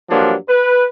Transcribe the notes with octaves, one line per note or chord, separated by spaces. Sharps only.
G2 F3 F#3 A#3 D4
B4